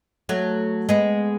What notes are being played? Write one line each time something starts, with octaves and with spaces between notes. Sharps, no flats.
F#3 A3
G#3 B3